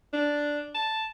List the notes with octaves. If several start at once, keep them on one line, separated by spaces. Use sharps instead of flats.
D4
A5